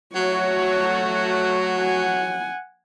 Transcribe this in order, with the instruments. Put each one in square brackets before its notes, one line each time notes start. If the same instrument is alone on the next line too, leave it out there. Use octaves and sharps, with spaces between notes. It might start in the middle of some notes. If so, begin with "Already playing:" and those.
[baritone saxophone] F#3 [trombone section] A3 F#4 [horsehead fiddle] C#5
[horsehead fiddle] F#5 G#5